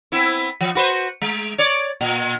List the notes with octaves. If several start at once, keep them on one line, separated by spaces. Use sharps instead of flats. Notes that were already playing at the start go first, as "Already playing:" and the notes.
B3 C4 E4
F3
F#4 B4 C5
G#3
C#5 D5
A#2